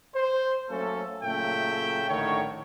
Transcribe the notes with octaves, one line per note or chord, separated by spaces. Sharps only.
C5
F#3 A3 A#3 C#4 A4
A#2 C#3 F#3 A3 E5 G5
A#1 A2 D3 D#3 C#5